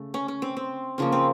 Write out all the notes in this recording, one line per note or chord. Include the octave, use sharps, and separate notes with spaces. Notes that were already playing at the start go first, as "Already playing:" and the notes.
Already playing: C#3 A3
C#4
C#4
C4
C4
C#3 F3 A#3 C#4
C4